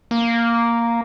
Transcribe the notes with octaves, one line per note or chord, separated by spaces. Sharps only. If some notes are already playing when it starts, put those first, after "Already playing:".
A#3